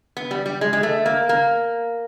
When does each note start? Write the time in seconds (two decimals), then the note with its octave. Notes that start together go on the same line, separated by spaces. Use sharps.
0.17 B3
0.31 G3
0.46 G3
0.61 G#3
0.73 G#3
0.83 A3
1.06 A#3
1.29 A#3